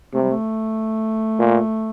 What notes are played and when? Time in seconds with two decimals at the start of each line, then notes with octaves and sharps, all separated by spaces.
0.14 C3 A3
0.22 G3
0.30 A3
1.39 A#2